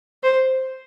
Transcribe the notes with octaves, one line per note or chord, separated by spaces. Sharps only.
C5